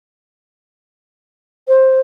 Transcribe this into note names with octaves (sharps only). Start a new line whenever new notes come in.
C5